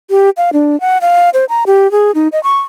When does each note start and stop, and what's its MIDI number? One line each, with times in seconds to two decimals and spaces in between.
0.10 0.30 67
0.37 0.50 77
0.53 0.79 62
0.81 0.98 78
1.01 1.30 77
1.34 1.45 72
1.49 1.64 82
1.67 1.90 67
1.92 2.11 68
2.15 2.28 63
2.32 2.42 75
2.43 2.59 85